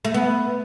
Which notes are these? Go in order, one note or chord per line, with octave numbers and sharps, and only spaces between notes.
A3
B3